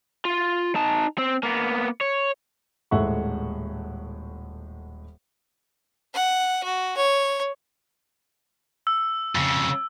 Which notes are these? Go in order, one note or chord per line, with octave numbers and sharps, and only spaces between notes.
F4
D#4 A5
C4
A#3 B3
C#5
D#1 A2 G#3 E5 F#5 C#6
F#5
F#4
C#5
E6
F2 C#3